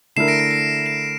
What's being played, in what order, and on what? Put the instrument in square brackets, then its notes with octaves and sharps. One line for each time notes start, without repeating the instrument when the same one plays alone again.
[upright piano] D3 A3 E4 A#4 [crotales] C7 E7
[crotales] A#6 D7
A#6
C7
C7 E7